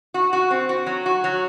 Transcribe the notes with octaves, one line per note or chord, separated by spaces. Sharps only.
F#4
F#4
C4
F#4
F#3
F#4
F#3